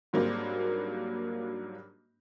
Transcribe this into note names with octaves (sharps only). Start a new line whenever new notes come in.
G#2 F#3 G3 A#3 C4 D4